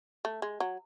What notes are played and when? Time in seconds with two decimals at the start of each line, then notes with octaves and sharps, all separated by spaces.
0.25 A3
0.42 G#3
0.60 F#3